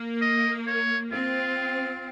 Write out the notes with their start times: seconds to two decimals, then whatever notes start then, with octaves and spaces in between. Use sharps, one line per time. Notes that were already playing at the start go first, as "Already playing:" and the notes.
Already playing: A#3
0.21 D#5
0.67 C#5
1.12 C4 F4